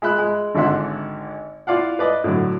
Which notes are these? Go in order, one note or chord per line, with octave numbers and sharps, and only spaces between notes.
G#3 E5 B5 F#6
G#3
G#1 G#2 D3 E5 F#5 C6
E4 F4 D5 F5 F#5
B4 D5 D#5
A2 D3 F#3